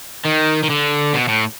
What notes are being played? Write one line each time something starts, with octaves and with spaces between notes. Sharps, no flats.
D#3
D#3
D3
B2
A2